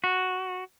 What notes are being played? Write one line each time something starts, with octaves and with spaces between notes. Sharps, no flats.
F#4